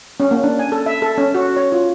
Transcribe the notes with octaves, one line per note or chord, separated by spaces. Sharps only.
C#4
A#3
D4
G#5
A4
E5
A4
C#4
F#4
C#5
F4